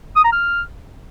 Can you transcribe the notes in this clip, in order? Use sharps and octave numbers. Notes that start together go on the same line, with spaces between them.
D#6
A#5
F6